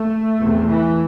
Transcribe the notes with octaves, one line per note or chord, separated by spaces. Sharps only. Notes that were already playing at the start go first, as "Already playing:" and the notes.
Already playing: A3
E2 C3
E3